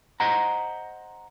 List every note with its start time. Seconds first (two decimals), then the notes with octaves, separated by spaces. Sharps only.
0.20 C5 D#5 F#5 A#5